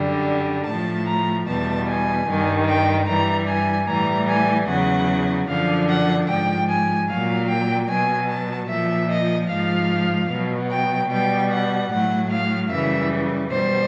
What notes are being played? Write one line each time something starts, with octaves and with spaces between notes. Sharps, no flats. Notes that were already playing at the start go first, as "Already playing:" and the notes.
Already playing: F#2 D3 G3
A2 F3 A5
A#5
E2 B2 G3 A5
G#5
G2 D#3 G3
G5
G2 E3 G3 A#5
G#5
A2 E3 G3 A#5
G#5
E2 C#3 F#3 F#5
F#2 D3 F3 F5
F#5
G#2 F3 G5
G#5
A#2 F#3 F5
G5
B2 F#3 G#5
A5
A#2 F3 E5
D#5
G#2 F3 F5
B2 F#3
G5
B2 G3 G5
F#5
A2 F#3 F#5
F5
F#2 C#3 E3 G3 E5
B2 G3 C5